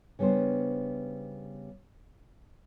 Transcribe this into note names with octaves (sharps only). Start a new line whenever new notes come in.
C#3 G3 B3 D4 C5